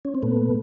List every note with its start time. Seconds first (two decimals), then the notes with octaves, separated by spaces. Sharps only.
0.05 C#4
0.15 C4
0.22 A#2 A3 B3